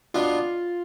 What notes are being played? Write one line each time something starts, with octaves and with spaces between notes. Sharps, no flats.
B2 B3 D4 F4